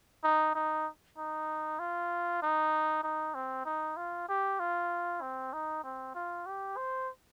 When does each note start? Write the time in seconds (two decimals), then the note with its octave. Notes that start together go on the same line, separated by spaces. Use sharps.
0.24 D#4
0.55 D#4
1.18 D#4
1.79 F4
2.42 D#4
3.04 D#4
3.35 C4
3.66 D#4
3.97 F4
4.29 G4
4.60 F4
5.22 C4
5.53 D#4
5.84 C4
6.15 F4
6.46 G4
6.77 C5